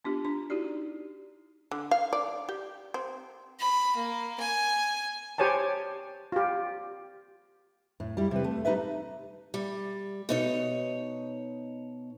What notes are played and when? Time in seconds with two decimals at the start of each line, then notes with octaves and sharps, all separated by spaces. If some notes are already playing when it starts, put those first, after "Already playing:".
0.05 B3 D4 F4 G4
0.25 D4 A#5
0.50 D#4 E4 F#4 G4 D5
1.71 D3
1.91 F5
2.13 D5
2.49 G4
2.94 C4
3.59 B5
3.95 A#3
4.39 G#5
5.38 G4 C5 C#5 G#5 A5
6.32 F4 G4
8.00 A2
8.17 G3 E4
8.31 C3 B4
8.44 A3
8.65 G3 D#4 F4 B4 E5
9.54 G3
10.29 B2 D#4 C#5